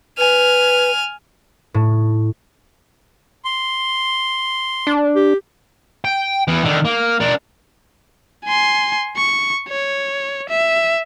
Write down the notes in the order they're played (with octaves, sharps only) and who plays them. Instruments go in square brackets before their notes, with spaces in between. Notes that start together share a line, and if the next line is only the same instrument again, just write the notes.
[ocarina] B4 [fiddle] G#5 F6
[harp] A2
[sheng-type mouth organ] C6
[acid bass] D4
[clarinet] G4
[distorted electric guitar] G5
E3 B3
D3 D#3
A#3
D4 A#4
[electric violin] G#5 C6
C#6
C#5
E5